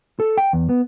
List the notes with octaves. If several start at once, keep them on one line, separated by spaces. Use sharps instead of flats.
A4
G5
E2
B3